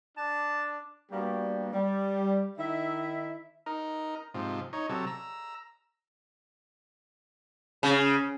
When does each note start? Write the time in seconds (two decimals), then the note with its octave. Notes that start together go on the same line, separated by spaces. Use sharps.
0.17 D4 A5
1.12 G3 A#3 B3 D4 F#4 G4
1.73 G3
2.58 D#3 D#4 E4 E5
3.66 D#4 A#4
4.34 G#2 C3 F3
4.73 D#4 C#5
4.89 C3 F#3 A4
5.07 A#5 E6
7.83 C#3